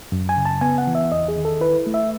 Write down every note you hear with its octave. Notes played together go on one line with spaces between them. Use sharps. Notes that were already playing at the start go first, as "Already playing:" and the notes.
F#2
G#5
C#3
A5
B3 G#5
F#5
E3
E5
E2 D#5
G#4
D#3
A4
E4 B4
A3
E5